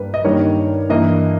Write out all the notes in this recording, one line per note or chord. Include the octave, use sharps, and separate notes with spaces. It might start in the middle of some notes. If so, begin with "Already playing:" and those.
Already playing: G2 G3 A#3 B4
D#5
G2 D#3 G3 A#3 C#5
G2 E3 A#3 D#5